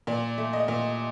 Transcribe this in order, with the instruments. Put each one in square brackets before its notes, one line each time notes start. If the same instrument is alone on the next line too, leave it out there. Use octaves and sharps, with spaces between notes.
[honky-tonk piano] A#2 D5
A3
D#5
A#2